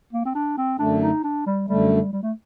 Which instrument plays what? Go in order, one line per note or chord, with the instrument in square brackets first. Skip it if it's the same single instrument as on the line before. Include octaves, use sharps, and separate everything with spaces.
[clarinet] A#3
C4
D4
C4
[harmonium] F#2 D3 A3 [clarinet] D4
[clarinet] D#4
D4
G3
[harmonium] F#2 D3 A3 [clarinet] G3
[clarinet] G3
A3